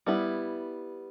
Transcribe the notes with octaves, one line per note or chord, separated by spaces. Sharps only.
G3 B3 E4